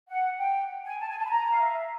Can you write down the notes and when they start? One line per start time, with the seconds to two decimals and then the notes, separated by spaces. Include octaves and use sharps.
0.09 F#5
0.38 G5
0.84 G#5
1.00 A5
1.08 G#5
1.17 A5
1.25 B5
1.30 A#5
1.51 F5
1.61 E5